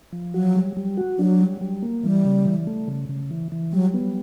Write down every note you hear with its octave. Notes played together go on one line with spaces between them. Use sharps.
F3
F#3 F#4
G3
G3
F#4
F#3 D4
G3
G3
A#3
E3 G3
C#3
E3
A3
C#3
C#3
E3
E3
F#3 G3
B3